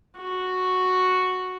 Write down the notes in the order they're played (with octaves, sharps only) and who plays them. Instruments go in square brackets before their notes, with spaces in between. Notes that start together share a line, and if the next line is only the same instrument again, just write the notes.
[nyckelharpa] F#4